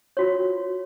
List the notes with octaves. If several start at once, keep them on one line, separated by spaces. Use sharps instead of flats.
F4 F#4 C#5